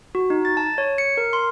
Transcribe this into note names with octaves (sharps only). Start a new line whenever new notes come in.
F#4
D#4
A6
A5
C#5
C#7
A#4
C6